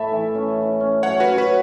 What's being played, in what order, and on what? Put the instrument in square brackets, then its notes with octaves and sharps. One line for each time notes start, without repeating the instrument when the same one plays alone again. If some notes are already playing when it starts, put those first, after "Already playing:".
Already playing: [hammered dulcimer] A2 A3 [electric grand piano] E5 A5 B5
[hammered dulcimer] E3
C#4
E4
C#4
[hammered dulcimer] F#3 [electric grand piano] C#5 F#5
[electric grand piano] F#4 B4
[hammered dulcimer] C#4
[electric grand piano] F#4 B4